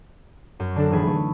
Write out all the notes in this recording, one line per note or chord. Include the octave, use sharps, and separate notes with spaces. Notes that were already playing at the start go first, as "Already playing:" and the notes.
F#2
D3 D4 A4
D#1 E3 G#4 B5
E3 A3